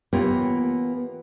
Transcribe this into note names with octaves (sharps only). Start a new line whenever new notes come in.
E3 A#3 B3 F4 G4 C#5